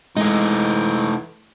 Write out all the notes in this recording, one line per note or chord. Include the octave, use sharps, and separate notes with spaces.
E3 G#3 A3 D#4